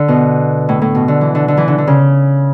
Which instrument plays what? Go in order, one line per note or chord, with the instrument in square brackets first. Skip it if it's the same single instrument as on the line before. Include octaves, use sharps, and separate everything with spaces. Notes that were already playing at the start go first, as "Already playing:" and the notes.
Already playing: [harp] D3
B2
A2
A2
B2
D3
E3
D3
D3
E3
D3
D3
C#3